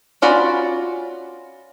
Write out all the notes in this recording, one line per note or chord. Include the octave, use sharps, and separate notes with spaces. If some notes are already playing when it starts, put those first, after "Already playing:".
C#4 F4 F#4 D5 B5